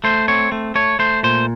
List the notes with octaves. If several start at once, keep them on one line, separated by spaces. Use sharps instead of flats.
A3 C5
C4 C#5
A3
A3 C#5
A3 C5
A#2 C5